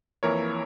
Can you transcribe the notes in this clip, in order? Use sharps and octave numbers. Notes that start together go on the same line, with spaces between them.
F2 E3 A#3 E4 A#4 C#5